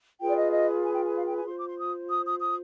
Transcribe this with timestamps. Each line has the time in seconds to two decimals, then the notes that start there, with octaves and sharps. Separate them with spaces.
0.21 F4 G#4 B4 G5
0.29 D5
0.36 D#5
0.52 D#5
0.83 G#5
0.94 G5
1.04 G#5
1.15 F5
1.25 G5
1.36 G#5
1.46 F4 C5 C6
1.57 D6
1.67 C6
1.78 D#6
2.09 D#6
2.25 D#6
2.40 D#6